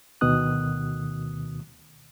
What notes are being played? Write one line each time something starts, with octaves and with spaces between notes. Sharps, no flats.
D2 B2 D#3 D#6 F#6